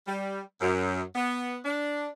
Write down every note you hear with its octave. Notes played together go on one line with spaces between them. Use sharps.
G3
F#2
B3
D4